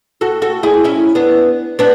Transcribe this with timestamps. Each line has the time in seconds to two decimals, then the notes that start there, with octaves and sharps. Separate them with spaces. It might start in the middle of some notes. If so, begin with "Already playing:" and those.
0.21 F#4 A4
0.42 F#4 A4
0.63 E4 G#4
0.84 C#4 E4
1.15 B3 D4
1.79 B3 D4